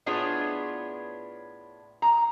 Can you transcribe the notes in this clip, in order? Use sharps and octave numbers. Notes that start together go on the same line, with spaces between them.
A2 B3 D4 F4 G#4 C#5
A#5